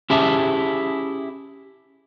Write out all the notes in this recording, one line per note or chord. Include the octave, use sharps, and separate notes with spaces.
C#4 E4 G4 G#4 E5 A5